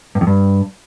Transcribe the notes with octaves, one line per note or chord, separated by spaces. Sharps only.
G2
F2
G2